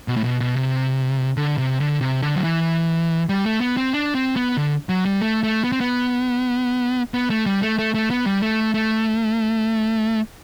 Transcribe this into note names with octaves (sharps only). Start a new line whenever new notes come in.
B2
A2
B2
B2
C3
D3
C3
D3
C3
D3
F#3
E3
G3
A3
B3
C4
D4
C4
B3
D3
F#3
G3
A3
A3
B3
C4
B3
B3
A3
G3
A3
A3
A3
B3
G3
A3
A3